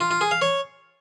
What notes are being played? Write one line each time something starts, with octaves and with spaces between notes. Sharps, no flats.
F4
F4
G#4
F5
C#5